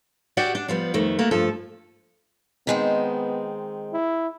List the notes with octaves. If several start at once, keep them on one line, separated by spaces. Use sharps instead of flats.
F#4 G4 D5 E5 F#5 G5
D4
F3 G3 B3
F2 D#3 A3
A3 A#3 F#4
G2 F3 A4
D#3 G#3 B3 C4
E4